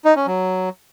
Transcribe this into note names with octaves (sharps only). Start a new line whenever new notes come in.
D#4
C#4
F#3